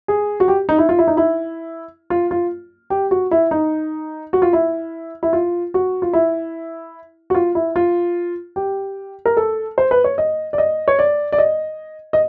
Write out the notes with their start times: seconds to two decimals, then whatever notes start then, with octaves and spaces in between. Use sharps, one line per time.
0.08 G#4
0.40 F#4
0.48 G4
0.69 D#4
0.78 E4
0.89 F4
0.99 E4
1.07 D#4
1.17 E4
2.10 F4
2.31 F4
2.90 G4
3.11 F#4
3.31 E4
3.51 D#4
4.33 F#4
4.42 F4
4.53 E4
5.23 E4
5.33 F4
5.74 F#4
6.02 F4
6.13 E4
7.30 F#4
7.35 F4
7.55 E4
7.76 F4
8.56 G4
9.26 A#4
9.37 A4
9.78 C5
9.91 B4
10.04 C#5
10.18 D#5
10.53 D5
10.58 D#5
10.88 C#5
10.99 D5
11.32 D5
11.38 D#5
12.13 D#5